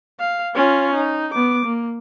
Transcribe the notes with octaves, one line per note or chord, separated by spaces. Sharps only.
F5
C#4 F4
D#4
B3 D6
A#3